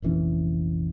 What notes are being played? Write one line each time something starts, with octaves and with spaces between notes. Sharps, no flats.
F1 A#1 E3 C#4